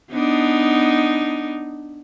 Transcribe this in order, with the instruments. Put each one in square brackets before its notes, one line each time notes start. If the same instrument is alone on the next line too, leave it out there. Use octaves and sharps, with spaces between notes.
[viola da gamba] B3 D4 D#4